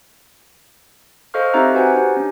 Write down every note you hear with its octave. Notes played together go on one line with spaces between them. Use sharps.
A4 C5 D#5 F5 C#6 F6
C4 D#4 G4 E5 A#5 F#6
F#4 B4 C5 F#5 G#5
D#4 G4
C#4 D4